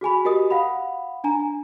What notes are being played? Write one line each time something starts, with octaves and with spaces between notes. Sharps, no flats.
F#4 G#4 G#5 B5
F#4 G4 A#4 D#5 D#6
F5 F#5 B5
D4 G#5 A#5